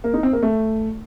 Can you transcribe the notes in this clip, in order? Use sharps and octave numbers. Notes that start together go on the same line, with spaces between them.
A#3
D#4
C4
A#3
A3